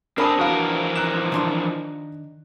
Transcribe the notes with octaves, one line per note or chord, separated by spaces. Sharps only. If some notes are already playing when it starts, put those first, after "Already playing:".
C4 D4 G#4 A#4 B5 D#6
E3 F3 F#4 A#4 F5
A#5 F#6 E7
D#3 D4 C6